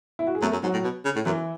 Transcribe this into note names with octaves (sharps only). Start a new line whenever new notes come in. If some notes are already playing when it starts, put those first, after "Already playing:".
E4
F#4
G#4
F#2 A3 A4
F#2
G#2 F#3 F#4
A2
B2
C#3
A2
F#2 E3 E4